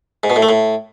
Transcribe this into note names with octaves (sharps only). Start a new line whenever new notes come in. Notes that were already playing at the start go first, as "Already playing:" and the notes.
G#2
B2
A2
A3
A2